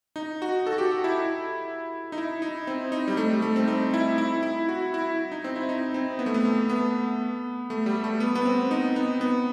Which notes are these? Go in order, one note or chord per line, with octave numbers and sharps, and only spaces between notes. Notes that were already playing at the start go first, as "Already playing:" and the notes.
D#4
F#4
A4
F#4
G4
F#4
E4
D#4
E4
D#4
C4
D#4
G3
A3
G3
A3
C4
D#4
E4
E4
E4
F#4
E4
D#4
C4
E4
D#4
C4
B3
A3
B3
A3
B3
A3
G3
A3
B3
B3
C4
D#4
B3
B3